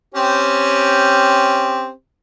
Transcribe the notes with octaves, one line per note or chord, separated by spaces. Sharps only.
C4 C#4 G4